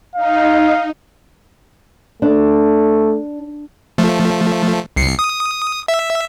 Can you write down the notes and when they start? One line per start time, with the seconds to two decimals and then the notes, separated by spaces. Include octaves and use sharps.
0.15 D#4 F5
2.22 A3 D4
3.98 F3 A3
4.96 C2 C7 C#7
5.19 D#6
5.88 E5